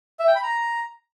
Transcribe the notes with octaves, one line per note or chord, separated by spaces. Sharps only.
E5
G5
B5
A#5